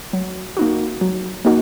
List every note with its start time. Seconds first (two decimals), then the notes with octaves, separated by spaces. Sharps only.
0.13 F#3
0.57 A#3 D#4 F#4
1.01 F#3
1.45 A#3 D#4 F#4